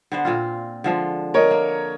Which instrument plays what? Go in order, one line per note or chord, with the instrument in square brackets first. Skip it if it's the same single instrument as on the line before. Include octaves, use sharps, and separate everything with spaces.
[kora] D3 B3 C5
A#2 C4 F4
D3 F3 G#3
[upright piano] A#4 C#5 D#5
[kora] A#3